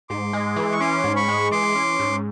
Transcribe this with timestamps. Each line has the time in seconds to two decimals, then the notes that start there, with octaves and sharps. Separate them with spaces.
0.09 G#2 C6 D6
0.33 G#3
0.56 E3
0.72 C#6
0.80 C#4 C6 D6
1.04 G#2
1.16 B5 C#6
1.28 G#3
1.51 E3 C6 D6
1.75 C#4
1.99 G#2